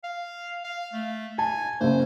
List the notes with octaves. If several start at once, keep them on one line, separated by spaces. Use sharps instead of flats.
F5
F5
A3
G#5 A5
F#1 C#3 C5